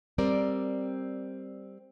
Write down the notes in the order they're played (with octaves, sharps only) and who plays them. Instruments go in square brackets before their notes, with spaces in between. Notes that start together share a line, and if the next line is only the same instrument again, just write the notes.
[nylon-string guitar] G3 C4 A#4 D5